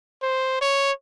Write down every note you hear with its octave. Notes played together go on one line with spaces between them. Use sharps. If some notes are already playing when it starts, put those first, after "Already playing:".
C5
C#5